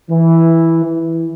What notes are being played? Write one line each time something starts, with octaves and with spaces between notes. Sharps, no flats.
E3
E3